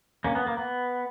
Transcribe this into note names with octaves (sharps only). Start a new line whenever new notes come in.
A#3 C#4
B3
A#3
B3